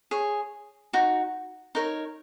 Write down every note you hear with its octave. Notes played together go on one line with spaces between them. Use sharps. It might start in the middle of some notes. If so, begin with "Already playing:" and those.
G#4 C#5
D#4 F#4
D#4 A#4 C#5